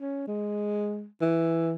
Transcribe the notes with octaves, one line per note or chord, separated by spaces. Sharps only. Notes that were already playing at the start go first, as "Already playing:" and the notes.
C#4
G#3
E3